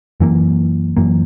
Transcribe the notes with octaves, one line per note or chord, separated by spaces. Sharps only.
F#2 E3 A#3
F#2 E3 A#3